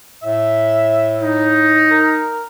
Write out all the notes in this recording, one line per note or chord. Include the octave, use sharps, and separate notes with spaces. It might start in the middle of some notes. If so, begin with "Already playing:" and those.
A2 E5
D#4
A#4